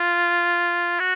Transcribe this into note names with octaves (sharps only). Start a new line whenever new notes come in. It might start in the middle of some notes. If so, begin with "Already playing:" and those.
Already playing: F4
F#4